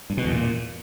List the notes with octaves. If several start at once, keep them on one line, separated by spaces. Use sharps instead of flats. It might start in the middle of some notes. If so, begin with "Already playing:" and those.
G2
B2
E2
A#2